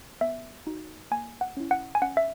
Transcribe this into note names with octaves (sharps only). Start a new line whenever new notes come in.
B3 E5
D#4 F#4
A#3 G#5
F#5
C#4 E4
F#5
G#5
C#4 F#5
E5